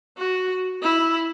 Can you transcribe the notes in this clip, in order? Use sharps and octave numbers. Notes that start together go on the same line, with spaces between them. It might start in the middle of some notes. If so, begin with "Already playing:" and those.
F#4
E4